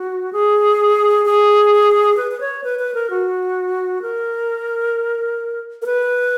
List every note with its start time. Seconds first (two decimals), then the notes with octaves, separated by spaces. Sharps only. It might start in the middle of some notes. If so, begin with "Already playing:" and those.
Already playing: F#4
0.33 G#4
1.25 G#4
2.17 B4
2.31 B4
2.40 C#5
2.64 B4
2.79 B4
2.94 A#4
3.10 F#4
4.02 A#4
5.82 A#4
5.86 B4